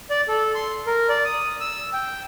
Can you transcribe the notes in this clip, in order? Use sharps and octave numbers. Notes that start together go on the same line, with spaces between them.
D5
A4
C6
A#4
D5
D#6
E6
G5